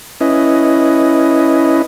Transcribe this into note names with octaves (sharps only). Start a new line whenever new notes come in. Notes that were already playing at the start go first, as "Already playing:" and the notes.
C#4 E4 B4 D#5